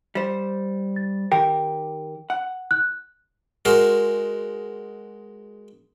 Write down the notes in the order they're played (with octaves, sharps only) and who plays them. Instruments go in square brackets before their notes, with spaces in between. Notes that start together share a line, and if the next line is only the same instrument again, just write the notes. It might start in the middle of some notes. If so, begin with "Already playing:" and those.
[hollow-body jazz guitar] G3 C5
[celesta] A6
[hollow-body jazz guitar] D#3 G4 A#4 [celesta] G5
[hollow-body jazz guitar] F#5
[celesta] F#6
[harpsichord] G#3 F#4 A#4 C5